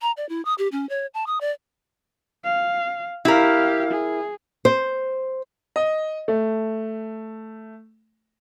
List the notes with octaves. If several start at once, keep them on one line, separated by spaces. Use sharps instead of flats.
A#5
D5
E4
D#6
G4
C#4
C#5
A5
D#6
D5
F5
E4 G4 A#4 F5
G#4
C5
D#5
A3